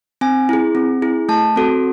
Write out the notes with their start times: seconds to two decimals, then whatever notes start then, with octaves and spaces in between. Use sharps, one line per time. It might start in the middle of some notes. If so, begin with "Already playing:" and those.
0.21 C4 G#5
0.49 E4 G#4
0.75 C4
1.02 E4 G#4
1.29 A3 A5
1.56 C4 F#4 A4